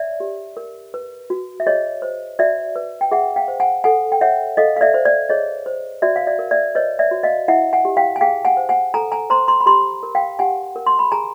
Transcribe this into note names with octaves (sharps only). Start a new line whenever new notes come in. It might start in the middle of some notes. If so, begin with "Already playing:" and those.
Already playing: C#5 D5 E5
G4
A#4
B4
F#4
E5
G#4 C#5 D#5
C5
F#4 D5 E5
B4
G5
G#4 E5 F#5
F5 G5
C5
F#5 G#5
A4 F#5 G#5
G5
C#5 E5 F#5
A4 D#5 F5
F5
D5 E5
C5
D5
G#4 C#5 D#5
C5
F#4 D5 E5
F5
D5 E5
A#4
D5 E5
B4 C#5 D#5
D5 E5
F#4
D#5 F5
E4 E5 F#5
F#5 G#5
G4
F5 G5
G#5
G#4 F5 G5
F#5 G#5
C5
F#5 G#5
A4 G#5 A#5
G#5 A#5
C5 A#5 C6
A#5 C6
B5
G4 A#5 C6
A#4
F5 G5
G4 F#5 G#5
A#4
C6
B5
G#4 G#5 A#5